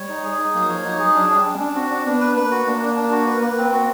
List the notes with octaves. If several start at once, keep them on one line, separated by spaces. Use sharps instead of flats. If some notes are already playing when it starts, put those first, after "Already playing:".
Already playing: G3 C#5
D#4
G#4
D#4
F#3 A#3
F3 C#5
F#3 D#4
F#3 G#4
F#3 D4
G3 D4
D4
C#4 D4
C4 F#4
D4
B3 D4
B4
B3
A#3 B4
F#4
A#3 D4
D4
D4
F#4
B4
B4
C4
F#4